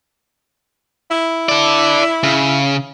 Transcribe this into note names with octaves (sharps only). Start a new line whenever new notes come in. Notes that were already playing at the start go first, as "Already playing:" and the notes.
E4
A4 D5
C#3